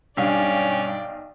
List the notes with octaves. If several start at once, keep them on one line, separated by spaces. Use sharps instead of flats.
B1 G2 C#4 D5 F5 G5 G#5